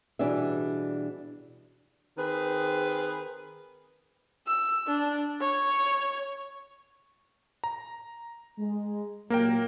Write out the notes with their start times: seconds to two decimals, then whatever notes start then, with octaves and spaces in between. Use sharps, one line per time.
0.19 B2 E3 G3 D4 G#4 E5
2.18 D#3 C4 G#4 B4
4.47 E6
4.87 D4
5.41 C#5
7.64 A#5
8.59 G#3
9.30 A#2 F#3 A#3 G4 A#4 G5